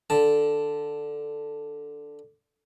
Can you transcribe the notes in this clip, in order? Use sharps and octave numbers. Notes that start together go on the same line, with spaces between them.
D3 A5